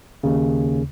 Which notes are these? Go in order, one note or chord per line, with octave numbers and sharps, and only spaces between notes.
D#2 C#3